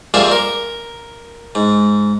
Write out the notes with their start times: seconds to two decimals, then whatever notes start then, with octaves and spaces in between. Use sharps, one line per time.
0.14 F2 A#2 G3 G#4 E5 F5
0.31 A#4
1.55 G#2